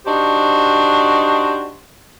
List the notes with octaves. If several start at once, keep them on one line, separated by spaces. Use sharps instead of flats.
D4 D#4 F#4 G4 C5